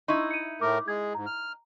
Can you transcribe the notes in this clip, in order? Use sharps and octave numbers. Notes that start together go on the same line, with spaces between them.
D#4 E4 C6 C#6
C#7 D#7
A2 A3 A#4 D6
G#3 G#4 G#6
G#2 A#5
F6